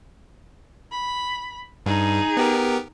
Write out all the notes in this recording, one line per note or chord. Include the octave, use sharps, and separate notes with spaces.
B5
G2 D#4 G#4
B3 G4 A#4